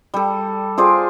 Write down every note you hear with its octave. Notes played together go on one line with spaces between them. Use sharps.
G3 A4
F4 G#4 C5 D5